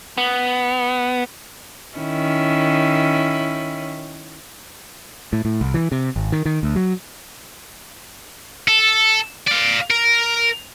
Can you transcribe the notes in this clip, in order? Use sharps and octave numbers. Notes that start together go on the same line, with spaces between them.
B3
D#3 C#4 E4
A2
A2
C2
E3
C3
G#1
D#3
D#3
D2
F#3
A4
D5 F5
A#4